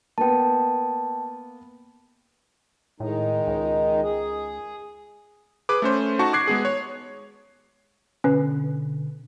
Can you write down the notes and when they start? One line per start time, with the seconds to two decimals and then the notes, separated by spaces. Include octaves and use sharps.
0.18 A#3 B3 G5 A5
3.00 A2 D#3 G#3 D#4
3.47 C#2
4.02 G#4
5.69 G#4 B4 D6
5.82 A3 C#4 C5
6.19 D#4 F#4 A5 C#6
6.33 D6 F#6 G#6 C7
6.47 G#3 B3 G#4
6.65 C#5
8.24 B2 D3 C#4 B4